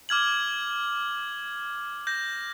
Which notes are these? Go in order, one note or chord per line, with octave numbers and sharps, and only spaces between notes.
D6 F6 G#6 F#7
G6 A#6